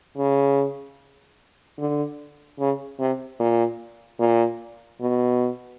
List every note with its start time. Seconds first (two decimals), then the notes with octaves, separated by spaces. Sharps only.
0.17 C#3
1.78 D3
2.59 C#3
2.99 C3
3.40 A#2
4.19 A#2
5.01 B2